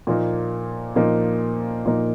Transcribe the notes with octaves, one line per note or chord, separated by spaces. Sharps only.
A#2 F3 A#3 D#4
A#2 F3 A#3 D#4
A#2 F3 A#3 D#4